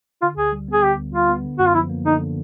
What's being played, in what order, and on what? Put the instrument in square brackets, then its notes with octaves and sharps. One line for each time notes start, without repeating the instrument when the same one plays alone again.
[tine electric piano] D3 [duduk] F4
[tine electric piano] D2 [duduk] G#4
[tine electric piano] G3
[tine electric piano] B3 [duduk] G#4
[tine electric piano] D3 [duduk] G4
[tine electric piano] D2
[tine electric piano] G3 [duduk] F4
[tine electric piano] B3
D3
[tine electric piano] F#2 [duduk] F#4
[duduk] F4
[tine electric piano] F3 [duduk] E4
[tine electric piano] A#3
[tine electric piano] D3 [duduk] D#4